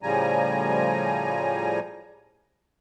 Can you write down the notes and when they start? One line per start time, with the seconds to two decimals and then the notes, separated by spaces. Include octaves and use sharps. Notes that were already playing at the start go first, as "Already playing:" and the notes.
0.03 A2 C#3 F3 G3 G#5 A#5